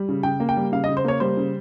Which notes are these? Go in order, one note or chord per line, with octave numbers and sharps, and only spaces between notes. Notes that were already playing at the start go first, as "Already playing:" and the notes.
Already playing: G3
C#3
C#3 G5
A#3
G5
G3
C#3 F5
D#5
C#3
C5
A#3 C#5
G3 C5
C#3